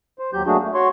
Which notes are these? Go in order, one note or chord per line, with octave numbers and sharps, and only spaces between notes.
C5
D#2 F#3 G4 G6
F#3 A3 A#3 D4 F#4 G#4
A3
F#4 C#5 C6 C#6